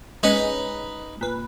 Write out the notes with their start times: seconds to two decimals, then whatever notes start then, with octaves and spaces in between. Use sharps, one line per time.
0.23 G#3 C#4 D#4 B4
1.21 A#2 B4